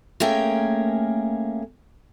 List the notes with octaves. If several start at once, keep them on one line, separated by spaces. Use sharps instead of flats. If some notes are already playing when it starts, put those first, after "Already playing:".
A3 A#3 C#4 G#4 A#4 G5